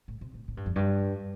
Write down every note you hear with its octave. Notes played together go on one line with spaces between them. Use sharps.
A2
C3
A2
A2
G2
F2
G2